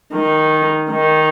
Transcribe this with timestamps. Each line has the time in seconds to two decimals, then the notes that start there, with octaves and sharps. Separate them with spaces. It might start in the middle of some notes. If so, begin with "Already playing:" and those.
0.13 D#3
0.90 D#3